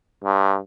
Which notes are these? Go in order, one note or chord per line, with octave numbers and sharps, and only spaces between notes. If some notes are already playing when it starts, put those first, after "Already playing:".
G2